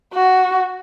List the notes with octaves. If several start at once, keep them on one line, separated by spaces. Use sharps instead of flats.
F#4